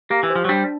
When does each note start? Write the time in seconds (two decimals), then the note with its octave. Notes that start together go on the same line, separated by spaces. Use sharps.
0.10 A#3 G4
0.23 E3
0.30 C5
0.36 F3
0.45 F#3
0.49 G3 D4